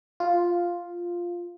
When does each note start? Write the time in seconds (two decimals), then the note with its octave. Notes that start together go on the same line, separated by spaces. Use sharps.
0.20 F4